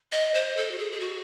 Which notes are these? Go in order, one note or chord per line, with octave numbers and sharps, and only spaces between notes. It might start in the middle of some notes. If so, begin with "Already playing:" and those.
D#5
C5
A4
F#4
G#4
G#4
F#4